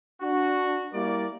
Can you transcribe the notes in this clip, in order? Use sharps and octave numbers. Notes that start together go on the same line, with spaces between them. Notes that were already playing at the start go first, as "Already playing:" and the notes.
D4 F#4
G3 A#3 E4 A#4 D5